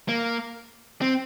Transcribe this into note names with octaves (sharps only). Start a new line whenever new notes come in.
A#3
C4